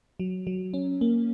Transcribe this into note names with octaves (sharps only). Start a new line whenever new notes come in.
F#3
F#3
C#4
A#3